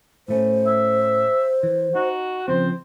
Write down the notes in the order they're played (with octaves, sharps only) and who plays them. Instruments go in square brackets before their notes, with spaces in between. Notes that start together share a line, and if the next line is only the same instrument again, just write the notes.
[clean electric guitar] A2 A3 C#4 [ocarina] C5
[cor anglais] E5
[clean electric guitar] E3
[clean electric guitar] D#4 [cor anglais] F#4
[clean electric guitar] C#3 F3 C4 [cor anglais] C5